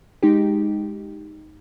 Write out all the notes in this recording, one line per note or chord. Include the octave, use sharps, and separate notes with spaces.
G#3 D#4 G4